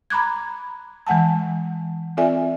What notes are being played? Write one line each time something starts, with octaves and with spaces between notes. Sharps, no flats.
A#5 B5 D6 F#6 G#6
E3 G#3 F#5 G#5 A5
C4 F4 A4 D5 E5 G#5